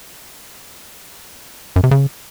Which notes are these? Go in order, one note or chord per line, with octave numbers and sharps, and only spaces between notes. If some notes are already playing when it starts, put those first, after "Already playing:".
F#2
C3
C#3